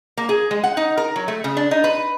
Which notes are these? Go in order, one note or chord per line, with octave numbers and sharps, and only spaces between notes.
A#3
G#4
G#3
F#5
D#4
A#4
F#3
A3
C#3
D4
D#4
B4